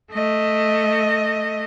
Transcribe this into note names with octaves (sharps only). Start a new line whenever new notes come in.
A3 D#5